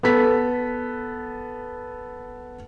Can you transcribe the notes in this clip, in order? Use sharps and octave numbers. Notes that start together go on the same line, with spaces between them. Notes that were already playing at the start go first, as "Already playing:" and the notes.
B3 A4 B6